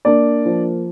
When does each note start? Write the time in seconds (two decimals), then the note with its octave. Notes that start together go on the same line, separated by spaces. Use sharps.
0.05 A#3 D4 D5
0.45 F3